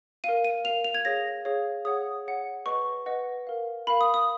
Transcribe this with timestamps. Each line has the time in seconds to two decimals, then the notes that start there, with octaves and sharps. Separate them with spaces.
0.24 A#4 F5 D#7
0.44 D#7
0.64 A#4 F5 F7
0.84 F7
0.94 G#6
1.05 G#4 C#5 F5 A#6
1.45 G#4 C#5 F5
1.85 G#4 C#5 F#5 D#6
2.26 G#4 C#5 F#5
2.66 B4 D#5 F#5 C#6
3.06 B4 D#5 F#5
3.47 A#4 F5
3.87 A#4 B5
3.90 F5
4.01 D#6
4.14 D#6